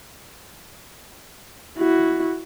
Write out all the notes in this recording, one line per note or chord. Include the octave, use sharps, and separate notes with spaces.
E4 F#4